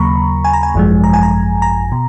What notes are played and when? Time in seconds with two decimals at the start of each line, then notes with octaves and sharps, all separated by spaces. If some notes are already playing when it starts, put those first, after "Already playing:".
Already playing: D#2 C#3 F#3 A#3 A#5 B5 C#6
0.44 G#5
0.53 A#5
0.63 G#5
0.74 G#1 F#2 F3 G#3
1.04 A#5
1.13 G#5
1.23 A#5
1.62 A#5
1.92 B2